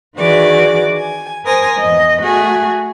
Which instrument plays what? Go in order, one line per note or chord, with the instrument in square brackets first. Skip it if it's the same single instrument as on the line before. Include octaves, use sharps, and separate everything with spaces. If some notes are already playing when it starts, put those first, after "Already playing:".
[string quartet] D#3 E3 F#4 G#4 D5 D6
G#5
A#4 C5 G#5 D#6 A#6
E2 D#5
A3 F#4 G#4